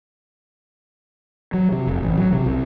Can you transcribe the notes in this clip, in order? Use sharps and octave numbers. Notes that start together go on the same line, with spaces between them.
F#3
C3
F1
A1
F#3
C3
C2